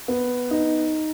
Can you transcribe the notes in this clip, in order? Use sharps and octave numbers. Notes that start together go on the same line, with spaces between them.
B3
D#4